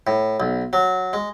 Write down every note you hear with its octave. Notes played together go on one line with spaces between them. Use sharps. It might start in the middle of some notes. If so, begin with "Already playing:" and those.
A2
B1
F#3
G#3